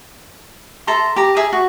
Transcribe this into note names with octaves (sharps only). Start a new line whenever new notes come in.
A4 E5 A#5 C6
G4 A#5
G#4 E5 D#6
F#4